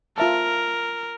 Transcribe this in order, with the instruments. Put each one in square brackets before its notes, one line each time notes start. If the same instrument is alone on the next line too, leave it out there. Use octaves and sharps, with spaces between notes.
[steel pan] F4 E5 A5 [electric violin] A#4